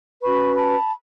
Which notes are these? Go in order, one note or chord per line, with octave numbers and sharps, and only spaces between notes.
C#4 F#4 B4 B5 C#6
A5 B5